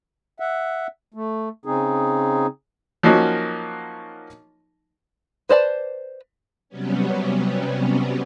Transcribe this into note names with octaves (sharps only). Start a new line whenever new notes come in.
E5 F#5
A3
C#3 C4 D#4 G#4
F3 F#3 A#3 C#4 D#4 F#4
B4 C5 D5 A5
C3 F#3 G3 B3 C#4